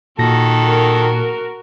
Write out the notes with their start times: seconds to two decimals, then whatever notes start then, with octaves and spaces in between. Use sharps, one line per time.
0.19 A#2 D#3 F#4 A4 A#6
0.63 F#4 A#4